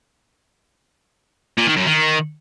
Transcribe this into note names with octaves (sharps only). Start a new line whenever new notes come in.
A#2
D#3
F#2
D#3